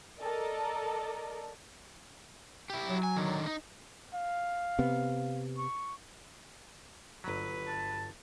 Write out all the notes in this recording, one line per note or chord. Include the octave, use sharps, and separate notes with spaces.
A4 A#4 D5 D#5 A#5
E4 G4
F#3
G#5
D3 D#3
D#4
F5
C3 B3
C#6
G1 F#3 B4
A5